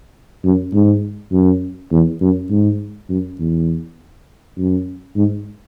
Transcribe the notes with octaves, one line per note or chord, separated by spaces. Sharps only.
F#2
G#2
F#2
E2
F#2
G#2
F#2
E2
F#2
G#2